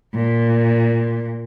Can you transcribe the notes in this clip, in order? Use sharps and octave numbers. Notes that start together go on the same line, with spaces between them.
A#2